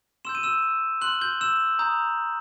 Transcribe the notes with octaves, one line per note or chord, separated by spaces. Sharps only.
C6 E6 G6 E7
D#7
E6 E7
C6 F6 F#6 F#7
G6 G7
E6 E7
A#5 D#6 G6